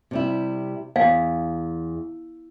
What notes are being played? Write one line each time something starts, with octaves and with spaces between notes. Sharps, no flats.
C3 G3 E4
E2 F5